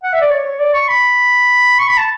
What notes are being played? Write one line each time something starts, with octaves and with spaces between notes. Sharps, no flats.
F#5
E5
D5
C#5
C#5
D5
C#6
B5
C#6
B5
A5